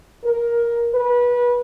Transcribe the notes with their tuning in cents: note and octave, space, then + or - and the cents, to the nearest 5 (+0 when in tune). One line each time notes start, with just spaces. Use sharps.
A#4 +10
B4 -25